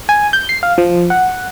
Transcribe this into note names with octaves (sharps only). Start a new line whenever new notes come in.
G#5
G6
C7
F5
F3
F#5